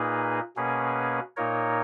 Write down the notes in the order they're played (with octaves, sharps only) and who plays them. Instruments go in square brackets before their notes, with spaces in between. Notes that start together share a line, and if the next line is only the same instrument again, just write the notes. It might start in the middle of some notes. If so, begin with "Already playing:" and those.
Already playing: [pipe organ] A#2 A#3 D#4 G#4 B4
B2 A#3 C#4 G#4 B4
A#2 A#3 D#4 A#4 C#5